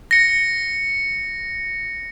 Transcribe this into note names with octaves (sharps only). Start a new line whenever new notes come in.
A#6 C#7